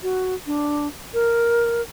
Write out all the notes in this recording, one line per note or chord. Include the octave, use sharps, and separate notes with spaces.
F#4
D4
A#4